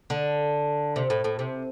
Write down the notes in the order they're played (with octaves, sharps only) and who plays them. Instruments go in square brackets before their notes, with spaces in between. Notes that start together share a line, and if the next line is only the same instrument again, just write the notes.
[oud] D3
C3
A2
A2
C3